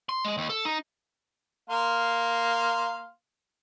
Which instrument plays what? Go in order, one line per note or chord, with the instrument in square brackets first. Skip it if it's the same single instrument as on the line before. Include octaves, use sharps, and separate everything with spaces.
[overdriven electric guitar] C6
G#3
D#2
A4
D#4
[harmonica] A#3 F5 C6